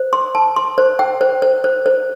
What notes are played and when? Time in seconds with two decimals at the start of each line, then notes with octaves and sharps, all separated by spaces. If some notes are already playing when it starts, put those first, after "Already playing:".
Already playing: C5
0.13 C6
0.35 A5
0.56 C6
0.78 C5
0.99 G5
1.21 C5
1.42 C5
1.64 C5
1.86 C5